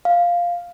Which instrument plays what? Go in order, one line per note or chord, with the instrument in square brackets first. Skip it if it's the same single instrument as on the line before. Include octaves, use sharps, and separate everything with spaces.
[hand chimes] F5